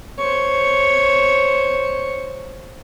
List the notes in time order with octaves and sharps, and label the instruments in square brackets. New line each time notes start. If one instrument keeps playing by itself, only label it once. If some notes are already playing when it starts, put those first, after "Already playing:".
[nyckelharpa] C5 C#5